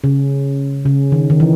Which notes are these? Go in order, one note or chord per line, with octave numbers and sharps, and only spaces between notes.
C#3
C#3
D#3
D#3
E3